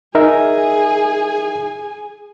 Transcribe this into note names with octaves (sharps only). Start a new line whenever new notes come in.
D#4 G#4 A#4 E5 G#5